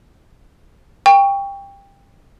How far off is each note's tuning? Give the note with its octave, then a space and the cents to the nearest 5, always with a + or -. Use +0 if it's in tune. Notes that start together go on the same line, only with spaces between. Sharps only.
G5 +20 C#6 +15